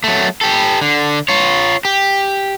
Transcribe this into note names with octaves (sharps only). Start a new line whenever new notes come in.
F#3 A3
G4 A4
D3
F4 C#5
G4